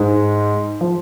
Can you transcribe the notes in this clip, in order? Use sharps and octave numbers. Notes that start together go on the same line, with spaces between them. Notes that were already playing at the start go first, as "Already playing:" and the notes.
Already playing: G#2 G#3
F3